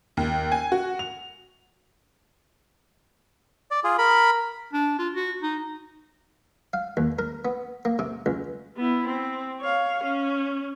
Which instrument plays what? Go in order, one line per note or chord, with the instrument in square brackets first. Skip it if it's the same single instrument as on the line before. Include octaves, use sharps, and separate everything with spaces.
[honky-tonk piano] D#2
G#5
F#4
F7
[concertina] D5
F4 G#4
A#4 B5
[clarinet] D4
F4
F#4
D#4
[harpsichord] F5
D#2
A#4
B3
A#3
C3
C#2
[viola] B3 E4
C4
C#5 F5
C#4